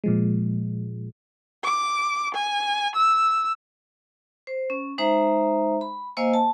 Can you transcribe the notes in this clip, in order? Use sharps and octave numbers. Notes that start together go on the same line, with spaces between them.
A#2 F3 G#3
D6
G#5
E6
C5
C#4
G#3 D#4 C5 E5 A#5
B5
A#3 C5 D#5 F5 G#5 E6
A5